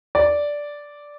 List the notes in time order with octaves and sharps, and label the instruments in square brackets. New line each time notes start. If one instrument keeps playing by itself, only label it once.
[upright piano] D5